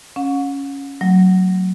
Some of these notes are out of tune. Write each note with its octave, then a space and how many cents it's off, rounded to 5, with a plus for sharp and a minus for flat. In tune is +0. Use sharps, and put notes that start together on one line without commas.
C#4 +0 F#5 -40
F#3 +0 A3 +30